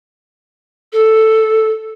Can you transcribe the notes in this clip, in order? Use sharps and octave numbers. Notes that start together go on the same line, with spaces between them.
A4